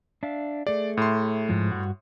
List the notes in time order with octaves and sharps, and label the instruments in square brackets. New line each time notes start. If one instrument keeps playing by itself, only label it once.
[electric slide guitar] D4 E5 F5
[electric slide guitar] A3 G#4 [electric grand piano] D5
[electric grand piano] A2 C6
[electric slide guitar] G#2 F3 G#3
G2 F#4